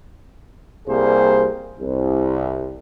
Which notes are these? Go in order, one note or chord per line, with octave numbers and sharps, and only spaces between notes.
C2 G3 A#3 G#4 C5
C2